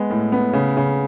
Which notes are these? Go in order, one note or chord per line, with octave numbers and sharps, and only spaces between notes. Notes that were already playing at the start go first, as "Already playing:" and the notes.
Already playing: G#3 B3
A2
B3
C#3
C#3